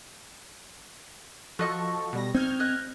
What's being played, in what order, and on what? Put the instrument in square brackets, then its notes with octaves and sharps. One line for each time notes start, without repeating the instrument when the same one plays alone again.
[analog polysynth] F3 A4 [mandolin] F#4 D#5 C#6
[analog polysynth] B2 G3 A#6
[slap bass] C4 [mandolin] D#4 [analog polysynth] F6 G6 G#6
[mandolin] D#5 F#6